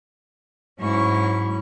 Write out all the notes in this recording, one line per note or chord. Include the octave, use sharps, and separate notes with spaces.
G#2 F#3 G#3 C#4 E4 C#6